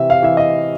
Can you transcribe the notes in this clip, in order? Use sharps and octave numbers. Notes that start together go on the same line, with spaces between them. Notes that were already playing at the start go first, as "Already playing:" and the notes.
Already playing: C3 E3 E5
F5
E3 E5
D#5